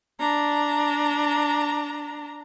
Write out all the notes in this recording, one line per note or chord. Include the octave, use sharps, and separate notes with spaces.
D4 A#5